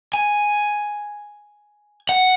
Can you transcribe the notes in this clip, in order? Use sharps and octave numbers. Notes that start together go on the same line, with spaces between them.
G#5
F#5